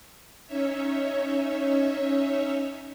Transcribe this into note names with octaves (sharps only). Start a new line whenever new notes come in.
C#4 D#4 C#5 E5